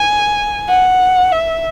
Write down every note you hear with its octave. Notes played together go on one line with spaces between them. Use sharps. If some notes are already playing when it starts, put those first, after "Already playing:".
Already playing: G#5
F#5
E5